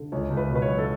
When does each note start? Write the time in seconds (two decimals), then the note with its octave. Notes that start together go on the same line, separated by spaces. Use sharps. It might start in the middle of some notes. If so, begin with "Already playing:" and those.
Already playing: D3
0.12 C#2 C#5
0.30 C#2
0.37 B4
0.49 B2
0.55 B4
0.62 C#5
0.68 F#3
0.78 A4